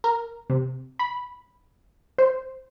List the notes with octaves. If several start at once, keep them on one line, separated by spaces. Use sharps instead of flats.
A#4
C3
B5
C5